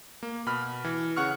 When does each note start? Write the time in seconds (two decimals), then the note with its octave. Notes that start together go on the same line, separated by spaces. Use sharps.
0.23 A#3
0.46 B2 B5 F6
0.84 E3
1.16 C#3 F#5 C#6 F6